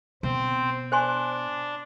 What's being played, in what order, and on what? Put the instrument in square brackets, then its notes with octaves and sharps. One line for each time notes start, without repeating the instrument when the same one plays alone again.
[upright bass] B2 [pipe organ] C4 C5
[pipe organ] D4 [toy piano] C5 G#5 C6